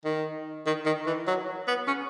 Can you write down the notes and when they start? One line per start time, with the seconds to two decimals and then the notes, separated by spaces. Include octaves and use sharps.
0.05 D#3
0.66 D#3
0.86 D#3
1.06 E3
1.28 F#3
1.68 B3
1.87 C#4